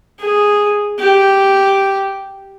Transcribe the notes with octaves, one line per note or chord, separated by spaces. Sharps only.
G#4
G4